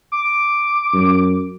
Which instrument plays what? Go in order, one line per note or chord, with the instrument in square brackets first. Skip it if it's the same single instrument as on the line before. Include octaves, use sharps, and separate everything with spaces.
[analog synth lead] D6
[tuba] F#2